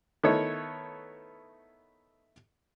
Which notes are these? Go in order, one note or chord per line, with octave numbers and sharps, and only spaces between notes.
D#3 A3 B3 E4 C#5